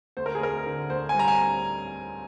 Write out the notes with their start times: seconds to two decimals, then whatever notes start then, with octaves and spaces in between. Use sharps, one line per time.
0.17 D2 C5
0.26 A#4
0.35 G#4
0.41 D2 A#4
0.66 D3
0.90 D2 C5
1.09 G#5
1.14 G3
1.19 A#5
1.28 G#5